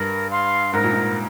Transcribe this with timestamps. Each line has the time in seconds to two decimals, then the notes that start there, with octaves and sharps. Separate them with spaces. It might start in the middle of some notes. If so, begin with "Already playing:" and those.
Already playing: G2 A#4
0.31 F5 C6
0.73 G#2 A#4
0.84 A#2
0.93 G#2